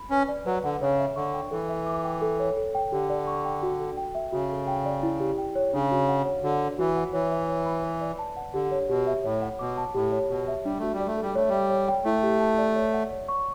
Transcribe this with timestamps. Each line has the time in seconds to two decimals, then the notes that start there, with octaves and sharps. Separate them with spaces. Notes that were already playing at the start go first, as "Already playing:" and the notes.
Already playing: B5
0.11 C#4 B4
0.29 D5
0.46 F#3 B4
0.64 D3 F#5
0.81 C#3 C#5
0.99 E5
1.16 D3 C#6
1.34 G5
1.51 E3 A4
1.69 E5
1.86 D6
2.04 G5
2.22 A4
2.39 C#5
2.57 A4
2.75 G5
2.92 D3 G4
3.10 D5
3.27 C#6
3.45 G5
3.63 F#4
3.80 A4
3.97 G5
4.15 E5
4.33 C#3 F#4
4.50 A4
4.68 G5
4.86 D5
5.03 E4
5.20 G4
5.38 G5
5.55 C#5
5.73 C#3 D4
5.91 F#4
6.08 F#5
6.25 C#5
6.43 D3 F#4
6.61 C#5
6.79 E3 F#4
6.96 F#5
7.13 E3 C#5
7.32 E5
7.49 C#5
7.66 B5
7.84 B4
8.01 D5
8.19 A5
8.37 F#5
8.54 D3 G4
8.71 C#5
8.89 B2 G4
9.07 E5
9.24 A2 C#5
9.42 F#5
9.59 B2 D6
9.78 A5
9.94 A2 G4
10.12 C#5
10.30 B2 G4
10.48 E5
10.64 G3 D4
10.78 A3 F#4
10.93 G3
11.00 D5
11.07 A3
11.17 G3 A4
11.35 A3 C#5
11.49 G3 E5
11.70 C#5
11.88 G5
12.05 A3 E4
12.23 G4
12.40 A5
12.58 D5
12.76 C#5
12.93 F#5
13.11 C#5
13.28 C#6